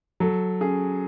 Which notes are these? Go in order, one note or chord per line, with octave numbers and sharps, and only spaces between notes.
F#3 A4
C#4 G#4